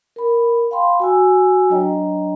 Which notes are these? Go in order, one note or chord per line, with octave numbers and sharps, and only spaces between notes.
A#4 B5
F5 G5 B5 C6
F#4 G#5 E6
F#3 D4 C#5 D#5 G5 A#5